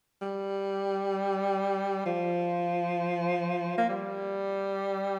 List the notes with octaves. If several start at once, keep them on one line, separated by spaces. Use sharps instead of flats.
G3
F3
A#3
G3